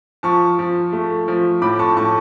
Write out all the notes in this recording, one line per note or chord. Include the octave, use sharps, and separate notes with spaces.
F3 A5 C#6
F3
A3
F3
A2 B5 D6
A5 C#6
A2 A5 C#6